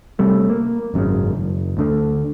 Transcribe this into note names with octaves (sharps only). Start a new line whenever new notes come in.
C3 G3 A3
A#3
G#1 F#2 A#2 C#3
F#1
D2 D3 A3